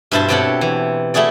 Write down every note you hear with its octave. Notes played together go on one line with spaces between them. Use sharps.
G2 B2 E4 C5 A5 C6
B2 C4 G4 A4 C#5 F#5
E3
A3 E4 F#4 G#4 D5